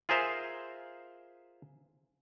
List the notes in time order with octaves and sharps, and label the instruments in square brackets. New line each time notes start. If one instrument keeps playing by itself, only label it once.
[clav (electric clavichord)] F4 G#4 A#4 C5 E5 F5